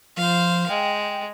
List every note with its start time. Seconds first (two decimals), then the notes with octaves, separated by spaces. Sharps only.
0.17 F3 C5 F5
0.69 G#3 G5